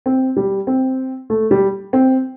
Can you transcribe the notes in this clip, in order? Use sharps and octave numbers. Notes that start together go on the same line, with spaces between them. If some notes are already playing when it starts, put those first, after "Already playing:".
C4
G3
C4
A3
G3
C4